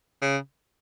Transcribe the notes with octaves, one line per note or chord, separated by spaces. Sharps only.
C#3